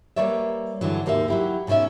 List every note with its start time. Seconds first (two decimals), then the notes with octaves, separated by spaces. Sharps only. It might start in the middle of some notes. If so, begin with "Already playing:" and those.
0.16 G3 A#3 B4 C#5 D5 E5
0.81 G2 D3 E3 F#3
1.06 D#2 G#2 A#3 G4 E5
1.28 F#3 E4 G4
1.67 G#2 B2 D3 C#4 E5